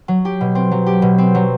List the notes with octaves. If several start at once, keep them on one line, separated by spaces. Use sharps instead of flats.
F#3
G4
B2
C4
F#3
G4
B2
C4
F#3